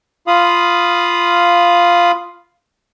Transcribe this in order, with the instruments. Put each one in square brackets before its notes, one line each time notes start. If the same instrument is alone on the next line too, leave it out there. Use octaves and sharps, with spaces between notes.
[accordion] F4 F5 B5 D#6